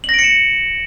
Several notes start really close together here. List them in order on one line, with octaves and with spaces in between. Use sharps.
F#7 A#6 D7 C#7 E7